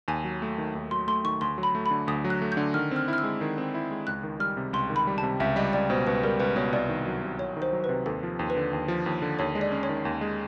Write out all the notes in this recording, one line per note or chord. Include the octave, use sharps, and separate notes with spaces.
D#2 G#5
F#3
A3
D#3
D#2
F#3 C6
A3 C6
D#3 C#6
D2 C6
F#3
B5
A3
B5
D3
D2 D#6
F#3
F#6
A3
G6
D3
D#3 F6
C4 F6
E4
F6
E6
G#3
D#3
C4
E4
G#3
C#2 F#6
D#3
G3 F6
C3
C#2 C6
D#3
B5
G3
C3 A5
C#2 E5
G3 D#5
C#2 D5
B2 C5
C#2 B4
G3 A#4
C#2 B4
B2 C#5
C2 D5
D#3
F#3
C3
C2 C#5
D#3
C5
F#3
C3 B4
D#2 A4
F3
D#2
B4
D3
D#2
F3
D#2
D3
D#2 C#5
G#3
D5
C#4
C#5
D#3
D#2
G#3